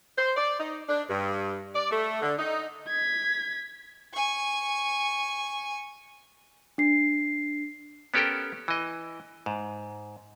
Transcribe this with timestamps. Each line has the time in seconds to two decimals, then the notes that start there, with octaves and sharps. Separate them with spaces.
0.18 C5
0.37 D5
0.60 D#4
0.89 D4
1.10 G2
1.75 D5
1.91 A3
2.22 D3
2.39 D#4
2.88 G#6 B6
4.14 G#5 C#6
6.78 D4 C7
8.14 B3 C#4 G4 A4 A#4 G5
8.68 E3 D#5
9.46 G#2